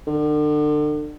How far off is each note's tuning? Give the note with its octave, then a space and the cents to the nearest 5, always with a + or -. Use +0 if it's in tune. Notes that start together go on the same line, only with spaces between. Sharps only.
D3 +35